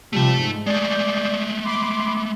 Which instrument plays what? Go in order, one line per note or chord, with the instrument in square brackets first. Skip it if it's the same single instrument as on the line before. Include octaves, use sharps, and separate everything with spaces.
[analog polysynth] C3 F3 G3 [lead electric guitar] A3 A5
[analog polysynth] G#2
[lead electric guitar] G#3 A3 [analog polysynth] D5 G6
[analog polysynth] B5 C6 D6